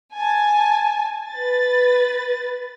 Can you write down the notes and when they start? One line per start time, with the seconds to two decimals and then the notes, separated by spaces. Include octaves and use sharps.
0.17 G#5 A5
1.30 B4 A6